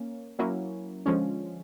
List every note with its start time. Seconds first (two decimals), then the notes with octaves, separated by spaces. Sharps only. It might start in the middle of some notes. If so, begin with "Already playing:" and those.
Already playing: A#3 C#4
0.39 F#3 A#3 C#4 E4
1.06 D3 F3 G#3 C#4